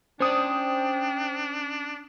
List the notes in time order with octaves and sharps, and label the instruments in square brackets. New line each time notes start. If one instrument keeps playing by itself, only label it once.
[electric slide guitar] C#4 D5 [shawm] D4 [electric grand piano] C5 D#6 [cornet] G5